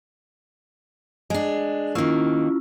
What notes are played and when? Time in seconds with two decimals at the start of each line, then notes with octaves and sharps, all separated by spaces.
1.30 G#3 D4
1.95 D#3 A#3 C#4 E4 F4